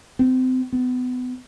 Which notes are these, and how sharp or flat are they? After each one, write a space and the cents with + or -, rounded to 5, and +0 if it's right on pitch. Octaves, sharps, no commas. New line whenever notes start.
C4 -30
B3 +30